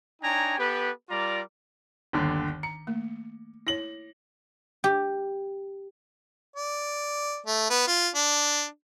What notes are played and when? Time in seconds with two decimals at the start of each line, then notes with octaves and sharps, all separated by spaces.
0.22 D4 D#4 C#5 G5 G#5 A#5
0.58 B3 G4 A4 B4
1.10 G3 F4 A#4 D5 A#5 D6
2.13 G1 D#2 D3 D#3
2.63 A#5 C#7
2.87 A3 A#3
3.67 E4 C#5 A#6 F#7
4.84 G4
6.56 D5
7.46 A3
7.70 B3
7.88 F4
8.15 D4